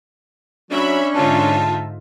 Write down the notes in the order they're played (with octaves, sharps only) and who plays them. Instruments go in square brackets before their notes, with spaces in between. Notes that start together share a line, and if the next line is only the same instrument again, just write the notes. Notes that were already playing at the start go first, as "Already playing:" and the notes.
[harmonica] F#3 [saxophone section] C#4 D4 [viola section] E5 B5
[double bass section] G#2 D3 [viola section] D#4 F4 E5 [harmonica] A5